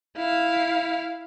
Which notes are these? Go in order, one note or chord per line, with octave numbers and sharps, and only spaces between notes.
E4 F5